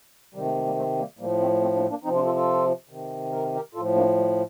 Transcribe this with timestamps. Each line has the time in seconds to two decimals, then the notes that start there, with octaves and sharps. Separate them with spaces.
0.35 C3 D#3 G3
0.45 A3
0.56 A3
0.66 G3 A#3
0.76 A3 C4
0.98 G3 A#3
1.19 A2 F3 G3 A#3
1.40 A3 C4
1.62 A3 C4
1.75 A#3 D4
1.90 A#3 D4
2.04 C3 F3 C4 D#4
2.15 D4 F4
2.25 F4 A4
2.36 F4 A4
2.89 C3 D#3
3.32 A#4
3.55 G4 A#4
3.75 A2 F3 F4 A4
3.96 A#3 D4
4.17 G3